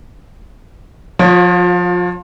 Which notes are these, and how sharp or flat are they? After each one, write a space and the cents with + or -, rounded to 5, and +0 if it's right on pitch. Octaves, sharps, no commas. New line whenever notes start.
F3 +25 F4 +40 C#5 -15